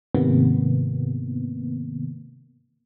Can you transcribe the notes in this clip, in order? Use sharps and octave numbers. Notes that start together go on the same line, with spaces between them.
G#2 C3 D#3 A#3 B3